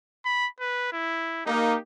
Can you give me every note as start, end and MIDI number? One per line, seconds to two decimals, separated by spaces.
0.26 0.48 83
0.60 0.89 71
0.92 1.44 64
1.46 1.76 58
1.46 1.76 63
1.46 1.80 67